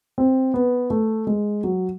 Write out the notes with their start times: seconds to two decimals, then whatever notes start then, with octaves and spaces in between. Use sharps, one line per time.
0.18 C4
0.54 B3
0.90 A3
1.27 G#3
1.64 F#3